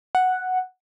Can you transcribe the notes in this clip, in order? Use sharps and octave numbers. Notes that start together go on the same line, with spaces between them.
F#5